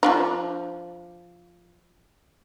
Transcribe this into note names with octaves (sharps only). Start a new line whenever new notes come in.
F3 D4 D#4